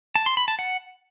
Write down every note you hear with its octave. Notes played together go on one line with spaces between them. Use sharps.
A5
C6
B5
A5
F#5